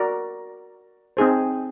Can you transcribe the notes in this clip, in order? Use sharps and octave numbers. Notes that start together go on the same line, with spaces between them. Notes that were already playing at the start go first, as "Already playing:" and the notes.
Already playing: F#4 A#4 D5
C4 D#4 G#4 C5